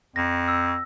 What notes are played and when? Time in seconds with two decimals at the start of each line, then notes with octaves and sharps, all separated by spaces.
0.16 F2 A#6
0.48 E6